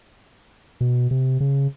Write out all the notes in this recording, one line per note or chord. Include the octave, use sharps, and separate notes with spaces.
B2
C3
C#3